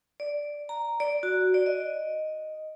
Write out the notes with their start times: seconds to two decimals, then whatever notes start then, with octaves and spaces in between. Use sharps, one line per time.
0.20 D5
0.69 A#5
1.00 D5
1.23 F#4
1.54 D5
1.66 D#5